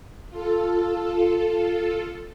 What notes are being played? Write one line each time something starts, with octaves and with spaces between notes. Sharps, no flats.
F4 A4